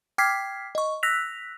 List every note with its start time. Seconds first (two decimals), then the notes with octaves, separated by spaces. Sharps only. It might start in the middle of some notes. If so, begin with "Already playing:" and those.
0.18 G5 D6 F6 G#6 B6 C7
0.75 D#5 C#6
1.03 E6 F#6 A#6 B6 F7